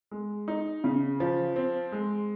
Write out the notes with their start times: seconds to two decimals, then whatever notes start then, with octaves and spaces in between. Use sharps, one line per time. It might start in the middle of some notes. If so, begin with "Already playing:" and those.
0.11 G#3
0.48 D#4
0.84 C#3
1.20 F3
1.56 C4
1.92 G#3